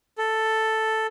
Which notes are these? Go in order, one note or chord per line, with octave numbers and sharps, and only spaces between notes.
A4